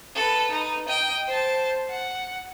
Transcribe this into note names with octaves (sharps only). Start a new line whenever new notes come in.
A4 B4
D#4
D#5 G5
C5 A5
F#5